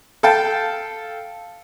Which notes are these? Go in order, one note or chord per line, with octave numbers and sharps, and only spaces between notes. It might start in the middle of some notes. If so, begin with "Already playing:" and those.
A4 F5 G5 A5